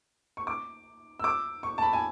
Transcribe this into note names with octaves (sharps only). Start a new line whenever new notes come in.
C#6
D6
E6
D6
C#6
A5
B5
G#5